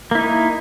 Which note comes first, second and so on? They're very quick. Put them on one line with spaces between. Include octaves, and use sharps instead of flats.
A#3 E4 D#4